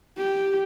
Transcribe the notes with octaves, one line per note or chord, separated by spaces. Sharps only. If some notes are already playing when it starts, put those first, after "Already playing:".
G4